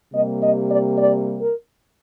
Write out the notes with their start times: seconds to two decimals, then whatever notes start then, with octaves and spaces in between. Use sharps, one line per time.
0.13 C3 G3 A#3 D#5
0.41 D#5
0.70 D5
0.98 D5
1.40 A#4